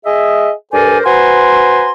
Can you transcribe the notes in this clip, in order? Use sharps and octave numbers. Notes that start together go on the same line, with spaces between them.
G#4 D#5 E5
G2 A4 A#4 C5 D5 G#5
F#4 B4 C5 G#5 A#5 C6